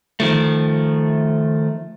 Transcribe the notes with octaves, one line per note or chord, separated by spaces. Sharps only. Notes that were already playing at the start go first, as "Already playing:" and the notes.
D#3 F3 A3